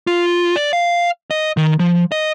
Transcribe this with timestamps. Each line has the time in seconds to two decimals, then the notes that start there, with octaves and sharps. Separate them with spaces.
0.07 F4
0.56 D5
0.73 F5
1.31 D#5
1.57 D#3
1.79 F3
2.12 D#5